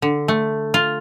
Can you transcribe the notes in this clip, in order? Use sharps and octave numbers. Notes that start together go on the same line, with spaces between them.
D3
A3
F4